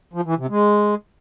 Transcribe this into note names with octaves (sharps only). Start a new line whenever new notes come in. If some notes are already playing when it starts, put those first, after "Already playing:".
F3
E3
C3
G#3